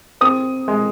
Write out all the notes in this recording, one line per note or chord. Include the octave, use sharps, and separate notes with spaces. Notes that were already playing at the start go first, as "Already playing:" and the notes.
C4 D#6
G#3